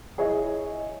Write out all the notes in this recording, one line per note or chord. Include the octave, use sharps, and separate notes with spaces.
E4 G#4 C#5 D#5 E5